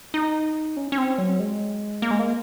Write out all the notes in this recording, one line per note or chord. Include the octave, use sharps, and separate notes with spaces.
D#4
C#4
C#4
C4
F#3
G#3
A#3
G#3
A#3